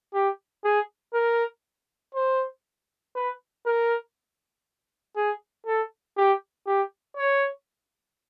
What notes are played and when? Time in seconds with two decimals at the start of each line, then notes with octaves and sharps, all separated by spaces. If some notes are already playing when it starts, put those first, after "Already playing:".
0.14 G4
0.64 G#4
1.14 A#4
2.14 C5
3.15 B4
3.66 A#4
5.16 G#4
5.66 A4
6.17 G4
6.67 G4
7.17 C#5